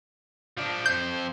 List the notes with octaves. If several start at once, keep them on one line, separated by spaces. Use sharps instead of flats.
F3 D4
F2 C5 G6